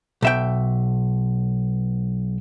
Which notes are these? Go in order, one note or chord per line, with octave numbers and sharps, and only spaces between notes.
B1 E5 G5